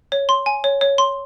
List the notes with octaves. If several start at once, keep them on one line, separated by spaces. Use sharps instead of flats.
C#5
C6
G#5
C#5
C#5
C6